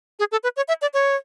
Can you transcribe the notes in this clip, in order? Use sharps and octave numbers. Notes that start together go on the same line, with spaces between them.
G#4
A4
B4
C#5
E5
D5
C#5